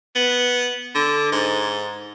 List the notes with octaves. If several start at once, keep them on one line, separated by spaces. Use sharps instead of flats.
B3
D3
G#2